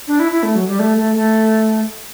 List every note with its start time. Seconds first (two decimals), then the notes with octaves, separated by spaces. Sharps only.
0.08 D4
0.19 E4
0.32 E4
0.43 A3
0.56 F#3
0.68 G3
0.79 A3
0.97 A3
1.15 A3